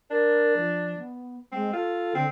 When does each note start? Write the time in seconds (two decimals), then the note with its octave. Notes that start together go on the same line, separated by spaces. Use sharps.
0.11 D4 A#4
0.57 F3
0.98 B3
1.52 G#3 C4
1.73 F4 A4
2.15 D3 C4